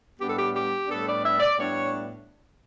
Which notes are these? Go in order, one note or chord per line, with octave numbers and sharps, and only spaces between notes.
A2 G3 B3 D4 G4
A4
G4
G4
A2 G3 B3 D4 A4
D5
E5
D5
A2 G3 B3 D4 C#5